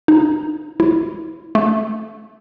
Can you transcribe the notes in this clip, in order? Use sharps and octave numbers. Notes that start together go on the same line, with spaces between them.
D#4
E4
A3